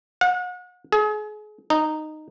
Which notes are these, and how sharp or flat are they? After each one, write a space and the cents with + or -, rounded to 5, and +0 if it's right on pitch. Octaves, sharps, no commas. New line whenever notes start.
F#5 -40
G#4 +35
D#4 -10